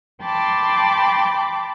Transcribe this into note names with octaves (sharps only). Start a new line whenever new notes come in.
G5 A5 B5 C6 D6